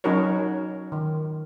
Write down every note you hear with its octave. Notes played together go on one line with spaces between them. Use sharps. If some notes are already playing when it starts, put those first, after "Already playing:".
F#3 C#4 D#4 F#4 A#4 C#5
D#3